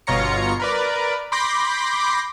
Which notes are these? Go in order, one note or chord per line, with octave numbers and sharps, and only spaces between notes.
G1 B2 F4 C#5 A#5 C#7
A#4 B4 D5
B5 C6 D6 G6 A#6 C7